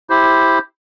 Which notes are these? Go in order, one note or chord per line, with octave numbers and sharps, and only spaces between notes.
E4 G4 C5